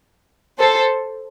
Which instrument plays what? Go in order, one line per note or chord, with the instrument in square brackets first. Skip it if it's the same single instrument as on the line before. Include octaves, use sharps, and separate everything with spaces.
[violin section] A4 C5